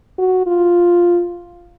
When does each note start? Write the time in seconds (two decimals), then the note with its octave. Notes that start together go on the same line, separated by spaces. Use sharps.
0.18 F#4
0.46 F4